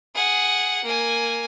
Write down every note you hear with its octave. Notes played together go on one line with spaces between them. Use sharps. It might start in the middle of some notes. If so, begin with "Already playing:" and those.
G#4 F#5
A#3 G#5